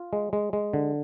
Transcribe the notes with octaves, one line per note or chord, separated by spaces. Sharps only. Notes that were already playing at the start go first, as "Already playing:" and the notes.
Already playing: F4
G#3
G#3
G#3
D3